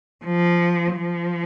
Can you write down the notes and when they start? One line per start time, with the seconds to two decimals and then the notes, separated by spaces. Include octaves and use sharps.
0.25 F3
0.94 F3